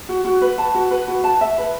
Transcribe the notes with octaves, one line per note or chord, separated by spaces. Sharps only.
F#4
F#4
B4
A5
F#4
B4
F#4
A5
E5
B4